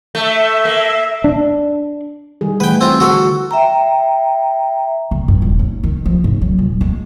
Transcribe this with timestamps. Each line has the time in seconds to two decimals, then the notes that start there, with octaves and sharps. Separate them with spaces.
0.15 A3 E5
0.65 A#3
1.24 D4
2.41 D#3 G3 G#4
2.60 E3 A3 B4 F#5 G5
2.81 C4 F4
3.00 D3 F#4 A4
3.51 E5 G5 A#5
5.11 D3
5.28 G2
5.42 D#1
5.59 D#2
5.83 D#3
6.06 F3
6.24 G#2
6.42 F#3
6.58 D#1
6.81 G#3